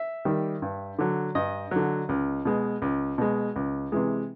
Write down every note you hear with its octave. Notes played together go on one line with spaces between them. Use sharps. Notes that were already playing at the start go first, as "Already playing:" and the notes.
Already playing: E5
D#3 G3
G2
D3 F#3
G2 D#5
D3 F#3
C#2
B2 G#3
C#2
B2 G#3
C#2
C3 E3 G#3